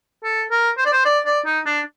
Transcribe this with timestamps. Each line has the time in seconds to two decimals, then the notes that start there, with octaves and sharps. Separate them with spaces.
0.24 A4
0.51 A#4
0.78 C5
0.86 D5
0.93 C5
1.05 D5
1.26 D5
1.46 D#4
1.66 D4